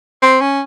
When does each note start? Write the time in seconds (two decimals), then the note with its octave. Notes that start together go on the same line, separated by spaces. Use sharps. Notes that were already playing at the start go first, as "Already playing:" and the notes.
0.22 C4
0.41 C#4